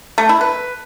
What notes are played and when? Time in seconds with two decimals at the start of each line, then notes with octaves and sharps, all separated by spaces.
0.18 A3
0.29 E4
0.41 B4